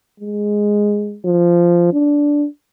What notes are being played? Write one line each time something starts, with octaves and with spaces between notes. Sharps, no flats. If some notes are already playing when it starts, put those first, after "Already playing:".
G#3
F3
D4